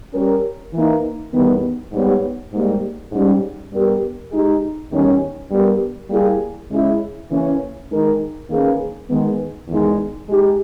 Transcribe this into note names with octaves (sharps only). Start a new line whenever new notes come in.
G3 C#4 G4 A#4
E3 A#3 D#4
E2 D#3 G3 B3
G#2 G3 B3 G4 C#5
G#2 G3 A#3
G#2 G3 C#4
G2 G3 B3 G4 A#4
G#3 D#4 G4
E2 D#3 G3 C#4
G2 G3 B3 G4 A#4
G3 A#3 E4 G#4
C#3 G#3 C#4 E4 G#4
C#3 E3 A#3 C#4
D#3 G#3 D#4 A#4
D#3 A#3 C#4 G#4 B4
D#3 G#3 B3
E2 D#3 G#3 D#4
G#3 D#4 G4